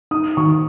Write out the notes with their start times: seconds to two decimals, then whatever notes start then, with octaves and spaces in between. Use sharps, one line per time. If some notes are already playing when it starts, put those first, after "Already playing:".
0.11 D#4 D#6
0.37 D#3 C#6